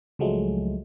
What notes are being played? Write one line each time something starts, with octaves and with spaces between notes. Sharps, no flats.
C#2 F3 F#3 G#3 A3